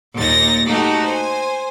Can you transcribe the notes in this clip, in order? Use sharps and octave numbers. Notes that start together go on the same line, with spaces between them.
D#2 A#2 D#4 A6 A#6
A3 D#4 F#4 G4 A4
C5 G#5